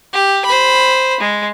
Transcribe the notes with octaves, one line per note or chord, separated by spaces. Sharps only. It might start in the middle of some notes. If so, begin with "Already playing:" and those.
G4
C5 B5
G#3